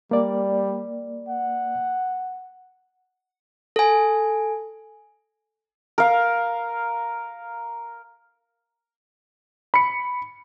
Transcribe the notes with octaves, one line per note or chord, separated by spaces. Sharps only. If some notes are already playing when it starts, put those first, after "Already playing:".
G3 A#3 D5
F#5
A4 G#5
A#4 F5
B5 C#7